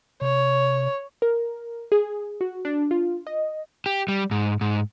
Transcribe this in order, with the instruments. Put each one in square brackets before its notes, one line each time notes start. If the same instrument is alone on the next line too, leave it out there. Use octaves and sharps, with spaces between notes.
[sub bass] C3 [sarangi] C#5
[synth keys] A#4
G#4
F#4
D4
F4
D#5
[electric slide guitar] G4
G3
G#2
G#2